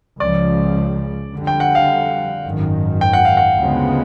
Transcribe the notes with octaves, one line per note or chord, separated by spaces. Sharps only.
C#2 C#3 F3 D5
F2 D3 G3
G5
F#5
F5
G#1 F#2 D#3
G5
F#5
F5
F#5
D2 C#3 F3 G#3 B3